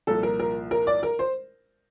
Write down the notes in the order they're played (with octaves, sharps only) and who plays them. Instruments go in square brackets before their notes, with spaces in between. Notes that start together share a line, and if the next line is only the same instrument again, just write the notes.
[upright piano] C2 A#2 F3 A4
A#4
A#4
A#4
D5
A#4
C5